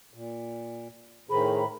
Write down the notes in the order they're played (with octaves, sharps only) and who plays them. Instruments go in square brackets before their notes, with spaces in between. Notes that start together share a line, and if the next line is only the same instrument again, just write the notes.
[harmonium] A#2
[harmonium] A2 D#3 [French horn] G#4 [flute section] C5 A#5 B5